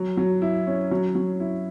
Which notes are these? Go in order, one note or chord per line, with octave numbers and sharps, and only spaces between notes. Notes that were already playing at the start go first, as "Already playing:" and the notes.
Already playing: F#3
F#3
E4
C#4
F#3
F#3
E4